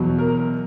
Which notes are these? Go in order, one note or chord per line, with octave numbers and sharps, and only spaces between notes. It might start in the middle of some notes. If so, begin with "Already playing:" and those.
Already playing: E2 B2 F#3
A#4